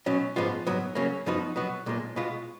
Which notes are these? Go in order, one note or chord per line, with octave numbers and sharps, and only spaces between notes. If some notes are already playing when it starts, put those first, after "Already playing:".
B2 F#3 C#4
G#2 F3 G#3 B3 F4
G#2 F#3 B3
C#3 F#3 A#3 C#4
F#2 F3 B3 D#4 F#4
B2 F#3 B3 F#4
B1 A#2 G#3
B2 G#3 B3 F4